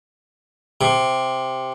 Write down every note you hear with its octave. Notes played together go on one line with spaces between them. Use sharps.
C3